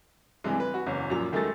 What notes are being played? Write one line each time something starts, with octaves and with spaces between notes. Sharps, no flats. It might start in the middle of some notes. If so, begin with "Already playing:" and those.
G2 C3 E3 G#3
B4
F#4
F#1 E2 C#4
F#2 A#2 F3 F7
F#2 D#3 G#3 A3 A4 A6